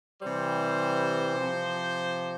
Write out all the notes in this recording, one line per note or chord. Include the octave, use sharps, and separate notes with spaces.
C3 E3 G3 C5
C3 F3